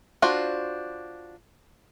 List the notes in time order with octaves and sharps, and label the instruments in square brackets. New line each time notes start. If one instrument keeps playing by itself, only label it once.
[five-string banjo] D4 F4 F#4 C5